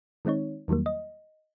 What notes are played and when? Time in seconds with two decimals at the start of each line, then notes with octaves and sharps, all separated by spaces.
0.25 D#3 G#3 C4 D#4 C#5
0.68 E2 D#3 F#3 G3 A#3
0.86 D#5